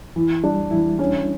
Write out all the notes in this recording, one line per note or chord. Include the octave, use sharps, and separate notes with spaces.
E3
G3 D4
E3 E4
C#4 D4